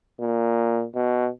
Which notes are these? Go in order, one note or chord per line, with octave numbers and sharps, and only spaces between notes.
A#2
B2